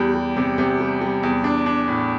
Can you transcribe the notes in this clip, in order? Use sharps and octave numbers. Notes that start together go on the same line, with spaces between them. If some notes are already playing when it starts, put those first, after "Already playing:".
Already playing: E2 G3
G3
C3
C3
G3
G3
E2
D4
D4
A2